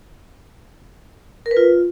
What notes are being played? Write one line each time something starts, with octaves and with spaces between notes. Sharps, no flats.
A#4
B4
F4